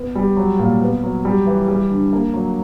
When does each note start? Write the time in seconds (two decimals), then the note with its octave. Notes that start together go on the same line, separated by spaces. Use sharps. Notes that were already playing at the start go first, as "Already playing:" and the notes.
Already playing: B3
0.15 G3
0.37 F#3
0.59 A#2
0.81 B3
1.03 F#3
1.25 G3
1.46 E3
1.68 G3
1.91 D3
2.13 A#3
2.34 F#3